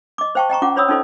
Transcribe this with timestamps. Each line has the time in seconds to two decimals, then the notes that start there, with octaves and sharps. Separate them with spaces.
0.18 D#5 D6
0.35 C5 F5 G5 A5 C#6
0.50 D#5 G5 A#5 C#6
0.62 C#4 F4 F#5 D6
0.76 F4 C5 C#5 B5 D#6 E6
0.89 C#4 D#4 F4 A4 C5 D#5